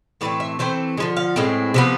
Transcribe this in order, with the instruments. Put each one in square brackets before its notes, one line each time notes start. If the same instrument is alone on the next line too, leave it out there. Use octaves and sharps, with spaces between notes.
[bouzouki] A2 E3 A3 C4 D5
E5
E3 A3 C4 C5
G#3
D3 F3
F5
A2 G#3 C4
C3 F3 B3